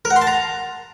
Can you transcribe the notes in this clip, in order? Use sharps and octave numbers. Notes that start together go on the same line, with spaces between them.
A#4
F#5
C6
A5
A#5